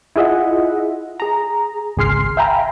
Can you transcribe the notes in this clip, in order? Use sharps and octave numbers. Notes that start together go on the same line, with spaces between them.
E4 F4 G#4 D#5 E5 F#5
G#4 A#5
G#1 C#2 G#4 C6 F6 C7
E5 F5 G5 G#5 A#5 B5